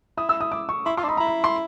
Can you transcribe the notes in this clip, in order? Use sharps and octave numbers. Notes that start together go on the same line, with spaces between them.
E4 D#6
E6
D#6
D6
C#6
E4 C6
F4 C6
D4
D#4 B5
E4 A#5
B5
C6